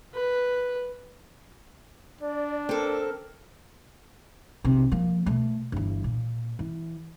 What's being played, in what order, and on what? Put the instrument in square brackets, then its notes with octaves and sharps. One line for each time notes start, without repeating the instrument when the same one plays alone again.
[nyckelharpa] B4
[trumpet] D4 [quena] D5
[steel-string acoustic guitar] C4 A4 [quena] A#4
[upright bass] B1 C3
F3 A#3
B2 A3
G1 E3
A#2
E3